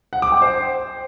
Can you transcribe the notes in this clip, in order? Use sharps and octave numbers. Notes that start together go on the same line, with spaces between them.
F#5
D6
G5
C5